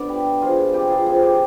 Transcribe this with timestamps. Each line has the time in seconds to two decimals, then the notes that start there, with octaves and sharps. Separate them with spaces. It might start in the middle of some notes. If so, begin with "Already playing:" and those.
Already playing: D3 B3 D5
0.08 D4 G4 B4
0.42 F3 F4 G#4
0.73 C3 G4 B4
0.89 F4 G#4
1.06 C4 F4 G#4
1.18 G4 G#4